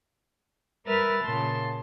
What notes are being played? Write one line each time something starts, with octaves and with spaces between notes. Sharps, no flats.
G3 A#4 B4 E5 F6 A6
A#2 C#3 A5 C6